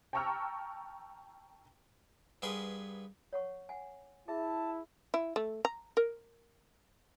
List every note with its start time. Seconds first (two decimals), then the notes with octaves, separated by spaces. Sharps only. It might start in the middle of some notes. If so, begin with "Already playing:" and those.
0.13 G5 A5 A#5 C#6 E6 F6
2.42 G2 B3 G#4 A#4 G#5 C6
3.33 C#5 F#5 C#6
3.69 F#5 G#5
4.28 E4 G#4 E5 A5
5.14 E4
5.36 A3
5.65 A#5
5.97 A#4